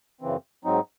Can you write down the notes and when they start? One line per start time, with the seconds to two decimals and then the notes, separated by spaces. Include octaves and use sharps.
0.21 F#2 C#3 E3 C4
0.65 G#2 F#3 C4 D#4